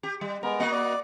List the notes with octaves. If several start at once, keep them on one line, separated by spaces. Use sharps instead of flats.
G4
G3
G#3 B3 A#4
A#3 F#4 D#5
D5